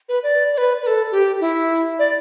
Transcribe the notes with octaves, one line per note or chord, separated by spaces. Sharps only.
B4
D5
D5
B4
B4
A4
G4
E4
D5